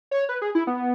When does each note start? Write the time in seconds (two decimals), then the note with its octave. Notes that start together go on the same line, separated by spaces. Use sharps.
0.11 C#5
0.29 B4
0.42 G#4
0.55 E4
0.67 B3